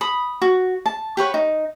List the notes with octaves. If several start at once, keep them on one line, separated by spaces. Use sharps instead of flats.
B5 D#6
F#4
A5
G4 B4 C#5 F#5
D#4